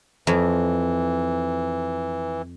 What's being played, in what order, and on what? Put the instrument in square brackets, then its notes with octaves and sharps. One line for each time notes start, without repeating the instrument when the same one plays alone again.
[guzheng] F2 [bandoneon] E3